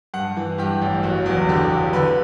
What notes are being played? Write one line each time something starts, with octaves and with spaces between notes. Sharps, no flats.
G2 F#5
E3
G2 G4
A1
F#1 F#4
E2
D3 G4
F#1
D3 B4